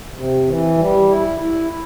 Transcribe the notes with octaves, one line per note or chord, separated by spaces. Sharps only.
C3
E3
G3
E4
E4